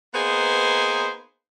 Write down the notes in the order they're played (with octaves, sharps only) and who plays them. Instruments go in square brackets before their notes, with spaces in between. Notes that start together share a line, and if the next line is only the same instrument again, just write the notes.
[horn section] A#3 B3 D#4 G#4 B4 C5